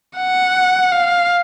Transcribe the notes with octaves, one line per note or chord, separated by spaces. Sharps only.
F#5
F5